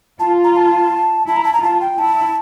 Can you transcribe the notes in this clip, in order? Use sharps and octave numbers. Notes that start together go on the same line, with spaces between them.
F4 A5
A#5
A5
E4 A5
A#5
A5
A#5
F4 A5
G5
E4 A5